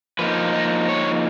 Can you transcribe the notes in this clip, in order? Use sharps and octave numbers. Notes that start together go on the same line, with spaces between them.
F3 A#3 D#4 B4
D#5
C#5